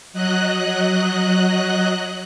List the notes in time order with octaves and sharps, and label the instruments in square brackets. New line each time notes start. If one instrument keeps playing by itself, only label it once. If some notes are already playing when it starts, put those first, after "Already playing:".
[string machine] F#3 D#5 F#6